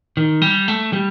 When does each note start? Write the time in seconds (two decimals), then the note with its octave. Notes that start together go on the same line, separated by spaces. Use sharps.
0.17 D#3
0.42 G3
0.68 A3
0.93 G3